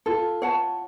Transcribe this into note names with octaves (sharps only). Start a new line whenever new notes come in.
F4 A4
C#5 F#5 A5